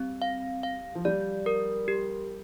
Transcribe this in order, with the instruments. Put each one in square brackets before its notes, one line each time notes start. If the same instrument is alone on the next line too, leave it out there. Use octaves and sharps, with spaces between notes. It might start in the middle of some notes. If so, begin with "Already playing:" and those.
Already playing: [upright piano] G3 [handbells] C4
[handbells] F5
F5
[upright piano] F3
[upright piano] G3 [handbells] D5
[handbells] A#4
G4